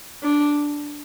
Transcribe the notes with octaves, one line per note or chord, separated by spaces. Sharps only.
D4